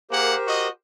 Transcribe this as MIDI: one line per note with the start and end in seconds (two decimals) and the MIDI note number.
0.11 0.35 58
0.11 0.68 67
0.11 0.35 68
0.11 0.68 70
0.11 0.68 72
0.11 0.35 78
0.47 0.70 66
0.47 0.70 75